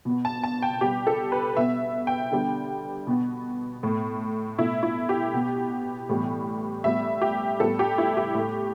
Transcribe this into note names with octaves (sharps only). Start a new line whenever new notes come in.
B2 B3
A5
A5
G5
B2 G3 B3 G4
A4
B4
B2 B3 E5
G5
D3 G3 B3
B2 B3
A2 A3
B2 A3 E4
E4
G4
B2 B3
A2 E3 G3 B3
A2 G3 B3 E5
G4
A2 G3 B3 A4
G4
E4
G4
A2 A3